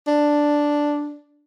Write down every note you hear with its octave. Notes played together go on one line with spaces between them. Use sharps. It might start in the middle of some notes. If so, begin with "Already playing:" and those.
D4